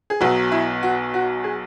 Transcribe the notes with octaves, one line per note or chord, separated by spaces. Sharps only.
G#4
B1 B2 F#3 F#4
E4
F#4
F#4
G#4